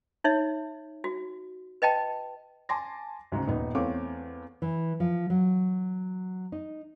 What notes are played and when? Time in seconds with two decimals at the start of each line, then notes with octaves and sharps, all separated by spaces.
0.24 D#4 C#5 E5
1.04 F#4
1.82 B4 D#5 G5 A5
2.69 G#5 A5 C6 D6 A#6
3.32 D2 G#2 C#3
3.48 D#1 B3 D#4
3.75 E2 A3 C4 C#5 F5 D6
4.62 E3
5.00 F3
5.30 F#3
6.52 D#4